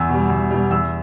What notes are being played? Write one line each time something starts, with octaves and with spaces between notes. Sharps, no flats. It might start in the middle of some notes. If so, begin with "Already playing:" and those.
Already playing: E2 E6
B2 G3
E2
B2 G3
E2 E6